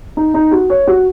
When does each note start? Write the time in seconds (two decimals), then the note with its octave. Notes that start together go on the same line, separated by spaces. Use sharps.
0.17 D#4
0.34 D#4
0.51 F#4
0.70 C#5
0.87 F#4